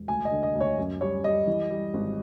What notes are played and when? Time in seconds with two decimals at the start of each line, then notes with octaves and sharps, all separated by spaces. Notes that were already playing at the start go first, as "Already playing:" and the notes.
Already playing: E1
0.08 D2 G#5
0.25 D#5
0.31 D3
0.43 D#5
0.55 D2
0.61 C#5
0.78 F#2
1.01 G3 C#5
1.24 G3 D#5
1.47 E3
1.70 G3
1.94 G#1